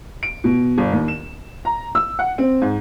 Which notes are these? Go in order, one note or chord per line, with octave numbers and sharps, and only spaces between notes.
D7
B2
G1
D#2
E7
A#5
E6
F#5
C4
G#2